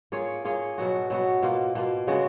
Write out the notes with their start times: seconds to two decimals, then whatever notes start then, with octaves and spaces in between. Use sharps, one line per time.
0.12 A#3 F4 G#4 C#5
0.45 A#3 F4 G#4 C#5
0.78 B2 F#3 B3 F#4
1.10 B2 F#3 B3 F#4
1.42 B2 A#3 F4
1.75 B2 A#3 F4
2.07 C#3 G#3 B3 F#4